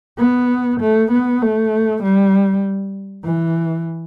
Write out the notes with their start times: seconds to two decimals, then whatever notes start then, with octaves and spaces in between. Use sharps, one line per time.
0.19 B3
0.80 A3
1.12 B3
1.42 A3
2.03 G3
3.25 E3